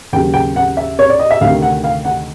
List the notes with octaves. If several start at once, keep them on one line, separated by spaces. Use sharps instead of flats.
D#2 C#3 F#3 G5
G5
F#5
E5
C#5
D5
D#5
E5
D2 C3 D#3 F5
F#5
F5
F#5